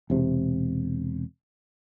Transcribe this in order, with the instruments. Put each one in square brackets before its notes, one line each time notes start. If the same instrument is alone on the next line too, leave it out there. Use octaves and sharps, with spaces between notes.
[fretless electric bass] E1 C3